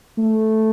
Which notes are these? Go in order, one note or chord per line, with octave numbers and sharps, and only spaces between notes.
A3